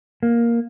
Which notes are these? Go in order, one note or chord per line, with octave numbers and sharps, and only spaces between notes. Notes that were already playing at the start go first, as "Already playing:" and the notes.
A#3